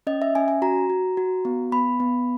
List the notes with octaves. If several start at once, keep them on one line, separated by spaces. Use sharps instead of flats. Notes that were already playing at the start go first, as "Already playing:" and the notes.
C#4 D#5
E5
C#4 G#5
G#5
F#4 A#5
F#4
F#4
B3
B3 B5
B3